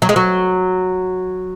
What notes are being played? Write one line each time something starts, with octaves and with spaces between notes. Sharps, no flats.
F#3
G#3
F#3